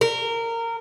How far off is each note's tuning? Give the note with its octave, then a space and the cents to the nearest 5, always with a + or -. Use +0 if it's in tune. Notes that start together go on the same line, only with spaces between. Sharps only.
A#4 -20